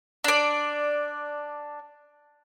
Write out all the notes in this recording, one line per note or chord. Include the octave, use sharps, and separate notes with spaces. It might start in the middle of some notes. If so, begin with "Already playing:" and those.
D4 D5